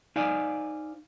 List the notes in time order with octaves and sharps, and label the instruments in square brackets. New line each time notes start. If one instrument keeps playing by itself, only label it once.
[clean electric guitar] D#4 C5 D5 F5 G#5